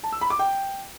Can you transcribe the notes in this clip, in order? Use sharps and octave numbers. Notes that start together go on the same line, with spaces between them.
A5
E6
B5
D6
G5